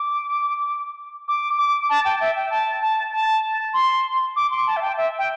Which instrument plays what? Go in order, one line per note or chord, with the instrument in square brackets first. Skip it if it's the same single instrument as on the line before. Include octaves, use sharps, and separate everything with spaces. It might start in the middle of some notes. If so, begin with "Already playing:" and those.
Already playing: [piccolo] D6
D6
D6
A5
G5
E5
G5
A5
A5
A5
C6
D6
C6
A5
E5
G5
E5
G5